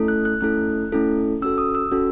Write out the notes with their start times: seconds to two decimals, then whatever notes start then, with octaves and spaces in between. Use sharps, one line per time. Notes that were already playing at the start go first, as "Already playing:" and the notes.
Already playing: A3 C#4 E4 A4
0.08 F#6
0.25 F#6
0.41 A3 C#4 E4 A4 F#6
0.92 A3 C#4 E4 A4
1.42 C#4 F#4 A4 E6
1.58 D#6
1.75 E6
1.91 C#4 F#4 A4